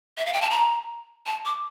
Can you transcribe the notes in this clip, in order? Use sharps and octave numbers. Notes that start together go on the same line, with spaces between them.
E5
F5
G5
A5
A#5
A5
D6